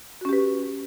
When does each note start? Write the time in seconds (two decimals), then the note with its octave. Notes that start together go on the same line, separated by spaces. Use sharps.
0.21 F#4
0.25 C#4
0.29 G4
0.33 B4